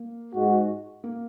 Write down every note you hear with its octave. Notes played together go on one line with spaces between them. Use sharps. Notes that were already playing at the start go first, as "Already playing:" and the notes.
Already playing: A#3
G#2 G#3 F#4
A#3